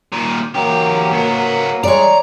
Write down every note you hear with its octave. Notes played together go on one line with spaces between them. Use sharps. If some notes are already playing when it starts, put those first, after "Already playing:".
A#2 D#3
E2 F#3 A#3 G4
C#2 B3
E3 G3 G#3 C#5 D5 A#5